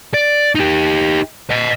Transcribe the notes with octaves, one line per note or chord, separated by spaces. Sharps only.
D5
D#4 G4
D#5 F#5